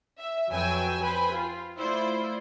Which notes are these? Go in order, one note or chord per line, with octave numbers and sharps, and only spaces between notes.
E5
F2 F#3 B4 G5 G#5 E6
B4 C5 G5 G#5 B5
F4
A3 E4 F4 C5 D5